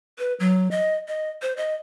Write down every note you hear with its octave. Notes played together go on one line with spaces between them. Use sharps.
B4
F#3
D#5
D#5
C5
D#5